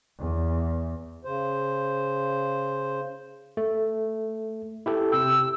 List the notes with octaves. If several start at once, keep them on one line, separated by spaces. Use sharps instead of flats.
E2
C#3 C5
A3
E4 G4 A4
C3 G5 E6